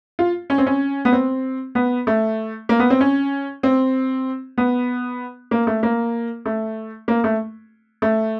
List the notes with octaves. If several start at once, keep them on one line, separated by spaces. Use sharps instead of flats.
F4
C#4
C4
C#4
B3
C4
B3
A3
A#3
B3
C4
C#4
C4
B3
A#3
A3
A#3
A3
A#3
A3
A3